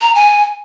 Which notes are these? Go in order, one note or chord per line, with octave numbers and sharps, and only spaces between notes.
A#5
G#5